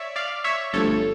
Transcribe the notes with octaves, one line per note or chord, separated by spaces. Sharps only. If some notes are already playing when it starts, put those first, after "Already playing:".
Already playing: C#5 D5 E5
D5 F5
C#5 E5
G1 G2 F3 A3 A4 C#5